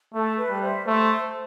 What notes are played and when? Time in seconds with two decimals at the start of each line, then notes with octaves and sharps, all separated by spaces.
0.13 A3 A4
0.37 B4
0.49 G3
0.62 C5 E5
0.86 A3 C5